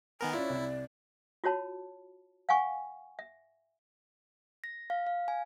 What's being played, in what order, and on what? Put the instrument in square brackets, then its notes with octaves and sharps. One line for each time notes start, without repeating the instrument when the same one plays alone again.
[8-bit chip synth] D#3 B3 A#4 [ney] G#5
[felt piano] C#4 F4 [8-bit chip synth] E4 [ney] D5
[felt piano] C2
[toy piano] F4 F#4 C#5 A5 B5
F5 F#5 G#5 C#6
E5
[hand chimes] A#6
F5
F5
G#5